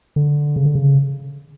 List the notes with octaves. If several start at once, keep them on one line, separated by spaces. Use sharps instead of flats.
D3
C#3
D3
C#3